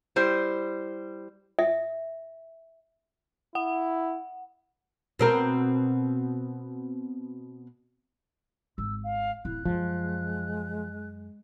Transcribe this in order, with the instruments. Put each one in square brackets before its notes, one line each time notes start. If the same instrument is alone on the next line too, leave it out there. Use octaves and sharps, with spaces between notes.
[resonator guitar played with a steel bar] G3 E4 C5
[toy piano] E5
[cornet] E4 [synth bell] F#5
[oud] B2 C4 A#4
[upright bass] G#1 [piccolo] E6
[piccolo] F5
[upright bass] D1 [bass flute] E4 [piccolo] F#6
[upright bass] F#2 [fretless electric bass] F3 [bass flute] G#3